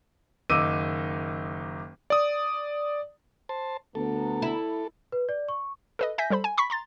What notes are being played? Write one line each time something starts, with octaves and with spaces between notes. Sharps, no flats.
F#1 D#3 D#4 D6 E6 D#7
D5 D#6
C5 A5
D2 B3 A4 A#5
E4
B4
D5
C#6
A4 B4 D#5
E5 G#5 G6 A#6 B6
G3 A4 C5 B5
G#5
B5 C#6 B6
A#5 C6 A6